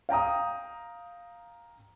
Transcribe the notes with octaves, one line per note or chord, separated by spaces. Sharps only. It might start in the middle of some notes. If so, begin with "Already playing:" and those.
F5 G5 A#5 D#6